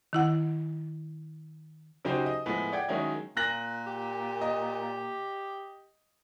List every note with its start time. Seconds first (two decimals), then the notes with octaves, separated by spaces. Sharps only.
0.13 D#3 E4 F#5
2.05 C#3 F#3 D#4 F#4 G4 C5
2.26 D#5
2.46 A2 F3 G#3 B3
2.73 D5 F#5 G5 G#6
2.88 D#3 F#3 G#3 C#4 D#4 E4
3.37 A#2 F#6 A#6 F#7
3.87 G4
4.41 D#5